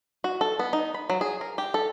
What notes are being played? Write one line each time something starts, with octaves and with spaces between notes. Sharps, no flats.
F#4
A4
B3
D#4
B5
F#3
G#4
A#4
G4
A4